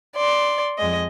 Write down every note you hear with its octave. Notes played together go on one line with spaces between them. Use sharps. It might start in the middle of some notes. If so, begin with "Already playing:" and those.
D5 C6
F2 G#3 D#5